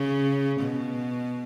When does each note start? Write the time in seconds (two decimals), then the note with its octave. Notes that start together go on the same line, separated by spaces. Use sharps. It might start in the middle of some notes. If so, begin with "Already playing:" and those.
Already playing: C#3
0.61 B2